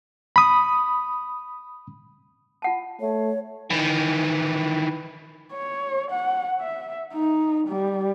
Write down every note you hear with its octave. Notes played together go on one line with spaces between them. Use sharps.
B5 D#6
F4 F#5 A5
A3 C#5
D#3 E3
C#5
F#5
E5
D#4
G3